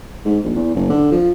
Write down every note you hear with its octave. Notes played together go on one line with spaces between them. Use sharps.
G#2
A#1
E2
F#1
D3
F3